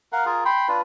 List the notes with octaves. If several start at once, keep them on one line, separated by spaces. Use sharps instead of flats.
A#4 F5 F#5
F4 G#4 A#4
G5 B5 C6
D4 F4 B4